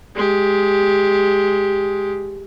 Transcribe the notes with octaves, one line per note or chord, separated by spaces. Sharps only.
G#3 G4